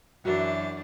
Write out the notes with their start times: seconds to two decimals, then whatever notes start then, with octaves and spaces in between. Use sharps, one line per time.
0.25 F#2 E3 D4 F#4 A#4 E5